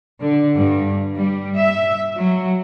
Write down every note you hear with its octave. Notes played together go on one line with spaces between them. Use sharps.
D3
G2
G3
E5
F#3